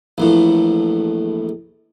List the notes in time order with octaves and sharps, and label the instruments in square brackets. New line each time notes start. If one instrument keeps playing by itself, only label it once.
[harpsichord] A#1 E2 A2